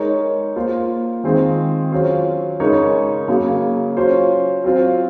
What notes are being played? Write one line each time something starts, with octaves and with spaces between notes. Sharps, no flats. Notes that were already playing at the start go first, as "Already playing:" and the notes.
Already playing: G#3 D#4 A#4 C#5
A#3 F4 C5
D#3 G#3 C4 F4 G#4
F#3 C#4 F4 C5
C#3 G#3 D#4 A#4 C#5
C#3 F#3 A#3
F#3 C#4 F4 C5
F#3 C4 F4 C5